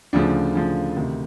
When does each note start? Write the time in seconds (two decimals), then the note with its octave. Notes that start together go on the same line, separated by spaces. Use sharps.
0.13 D2 C#3 F3 D4
0.54 D2 C#3 F3
0.96 D2 C3 D#3